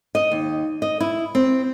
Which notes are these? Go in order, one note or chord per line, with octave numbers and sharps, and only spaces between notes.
D#5
D#2
D#5
E4
C4